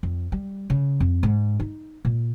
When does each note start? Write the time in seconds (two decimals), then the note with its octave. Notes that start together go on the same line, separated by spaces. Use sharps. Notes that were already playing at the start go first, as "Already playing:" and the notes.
0.03 F2
0.32 G3
0.70 C#3
1.00 F2
1.23 G#2
1.60 D#4
2.05 A#2